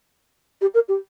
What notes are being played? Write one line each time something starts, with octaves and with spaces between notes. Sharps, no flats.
G4
A#4
G4